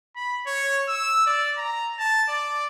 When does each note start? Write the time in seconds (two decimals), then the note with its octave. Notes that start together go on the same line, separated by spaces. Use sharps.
0.16 B5
0.47 C#5
0.88 E6
1.27 D5
1.58 A#5
1.98 A5
2.29 D5